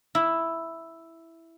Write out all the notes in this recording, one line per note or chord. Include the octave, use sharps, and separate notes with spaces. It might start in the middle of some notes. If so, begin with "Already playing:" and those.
E4